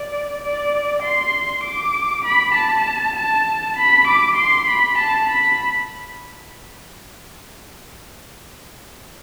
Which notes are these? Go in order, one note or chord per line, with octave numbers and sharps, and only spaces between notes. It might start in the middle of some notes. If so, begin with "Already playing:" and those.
Already playing: D5
D5
C6
D6
B5
A5
A5
B5
D6
C6
B5
A5
B5